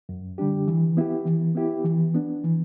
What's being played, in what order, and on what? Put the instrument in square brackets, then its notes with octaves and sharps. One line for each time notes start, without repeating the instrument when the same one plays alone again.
[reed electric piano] F#2
D3 G3 D4 G4
E3
B3 E4 G4
E3
B3 E4 G4
E3
B3 D4
E3